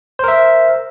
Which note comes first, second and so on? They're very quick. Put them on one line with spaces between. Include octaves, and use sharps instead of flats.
C5 A#4 E5